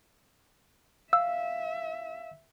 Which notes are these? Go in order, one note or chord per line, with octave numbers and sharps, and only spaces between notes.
E5 F5 E6